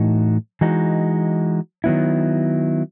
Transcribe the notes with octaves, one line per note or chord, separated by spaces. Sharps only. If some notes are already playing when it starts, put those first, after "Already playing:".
Already playing: A2 E3 A3 D#4 F#4
E3 G#3 D#4 F#4
D#3 F#3 B3 E4